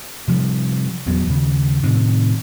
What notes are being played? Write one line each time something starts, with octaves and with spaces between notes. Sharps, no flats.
C3 F3 G3
D#1 E2 F#3 B3
D#2 C#3
A2 C3 D#3